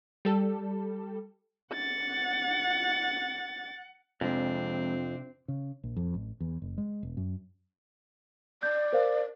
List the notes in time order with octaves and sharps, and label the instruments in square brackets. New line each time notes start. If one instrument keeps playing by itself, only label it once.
[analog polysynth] G3 A4
[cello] F#5 [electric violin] A6
[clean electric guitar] F2 [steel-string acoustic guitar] C3 D4 [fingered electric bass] F3 G#3 [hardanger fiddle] C4
[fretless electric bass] C#3
A#1
F2
A1
E2
F#1
G#3
E1
F#2
[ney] D5 [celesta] G6
[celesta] A#4 C5 F5